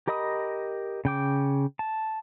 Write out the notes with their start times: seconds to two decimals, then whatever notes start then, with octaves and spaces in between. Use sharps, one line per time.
0.08 G4 A#4 D#5 B5 D#6
1.05 C#3 G5 D6
1.79 A5